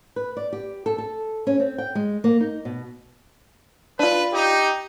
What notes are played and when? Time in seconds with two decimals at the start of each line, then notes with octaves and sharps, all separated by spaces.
0.16 B4
0.37 D5
0.53 G4
0.86 A4
0.98 A4
1.47 C#4
1.60 C4
1.78 G5
1.95 G#3
2.24 A#3
2.41 D#4
2.65 B2
3.99 D4 F4 B4
4.33 D#4 G4